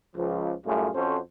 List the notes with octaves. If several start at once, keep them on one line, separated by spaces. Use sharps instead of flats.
C#2 F3
F#2 A2 G3 A3 F4 G#4
F2 C#4 F#4 A4 C5